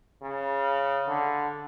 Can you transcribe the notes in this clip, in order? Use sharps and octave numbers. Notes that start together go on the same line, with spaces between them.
C#3
D3